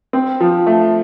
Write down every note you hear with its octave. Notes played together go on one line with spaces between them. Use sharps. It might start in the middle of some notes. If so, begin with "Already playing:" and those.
C4
F3
A3